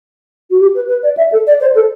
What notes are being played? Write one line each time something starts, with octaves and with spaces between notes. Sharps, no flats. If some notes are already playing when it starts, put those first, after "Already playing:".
F#4
G4
B4
B4
D5
E5
A4
D5
C5
A4